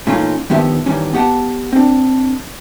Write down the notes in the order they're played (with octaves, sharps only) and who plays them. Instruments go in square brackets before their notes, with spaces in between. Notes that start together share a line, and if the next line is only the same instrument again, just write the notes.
[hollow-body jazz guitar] A#2 E3 A3 C#4 D#4 F4
G2 D#3 F3 B3 G4 E5
E2 G2 D#3 E3 G3 C#4
B3 G4 F#5 G5 A5
C4 D4